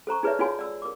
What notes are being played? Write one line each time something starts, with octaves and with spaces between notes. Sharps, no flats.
A4 C5 A#5 C#6
D#4 G#4 B4 C#5 D5 E5
D#4 F4 F#4 G#4 C#5 G#5
D5 E6
A#4 D6